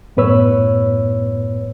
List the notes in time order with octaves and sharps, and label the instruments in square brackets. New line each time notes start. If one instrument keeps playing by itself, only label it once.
[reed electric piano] F#2 A2 B3 B4 C#5 E6